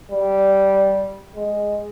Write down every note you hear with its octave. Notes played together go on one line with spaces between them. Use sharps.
G3
G#3